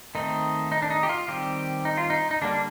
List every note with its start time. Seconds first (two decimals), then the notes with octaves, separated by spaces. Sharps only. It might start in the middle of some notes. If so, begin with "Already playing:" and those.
0.15 D#3 A3 C4 D#4
0.72 D#4
0.82 D4
0.90 D#4
1.03 G4
1.09 F4
1.28 D#3 G3 C4 G4
1.85 D#4
1.97 F4
2.10 D#4
2.31 D#4
2.42 D3 G3 A#3 D4